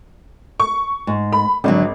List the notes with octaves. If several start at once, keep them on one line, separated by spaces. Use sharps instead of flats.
C#6
G#2
B5
G#1 D3 F3 F#3